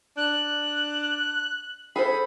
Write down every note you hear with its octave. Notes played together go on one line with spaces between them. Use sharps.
D4 F#6
G#4 A4 C5 B5